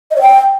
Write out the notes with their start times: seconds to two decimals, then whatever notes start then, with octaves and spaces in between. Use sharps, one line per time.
0.11 D#5
0.16 C#5
0.21 G5